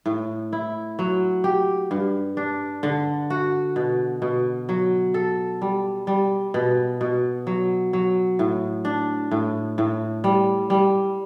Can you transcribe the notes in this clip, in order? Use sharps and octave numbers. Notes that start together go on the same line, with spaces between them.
A2
E4
F#3
G4
G2
D4
D3
F#4
B2
B2
F#3
A4
G3
G3
B2
B2
F#3
F#3
A2
D4
A2
A2
G3
G3